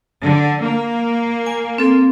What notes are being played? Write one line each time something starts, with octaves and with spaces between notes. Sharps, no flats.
D3
A#3
G#5
C4 A4